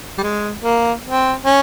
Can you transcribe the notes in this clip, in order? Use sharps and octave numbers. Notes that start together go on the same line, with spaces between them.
G3
G#3
A#3
C4
C#4